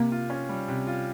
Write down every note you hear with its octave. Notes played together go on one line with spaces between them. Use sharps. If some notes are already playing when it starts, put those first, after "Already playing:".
Already playing: C3 A#3
F4
C#4
G3
C3
F4